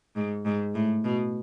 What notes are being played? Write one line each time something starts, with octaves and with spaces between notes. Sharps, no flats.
G#2
G#2
A2
B2